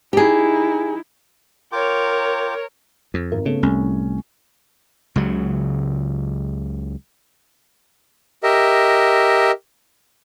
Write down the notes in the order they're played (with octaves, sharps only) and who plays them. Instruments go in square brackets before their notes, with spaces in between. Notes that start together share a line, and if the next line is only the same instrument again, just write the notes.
[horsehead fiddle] D#4 E4 [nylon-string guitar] G4 G#4
[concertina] F4 G5 D6 [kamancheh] A#4 C#5
[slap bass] F2
[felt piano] G#1 A#4
[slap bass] C#3 [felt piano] A3 B3
[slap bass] C2 [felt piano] A2 C#4
[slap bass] C#2 C#3 F#3
[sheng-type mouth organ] G4 A#4 D#5 E5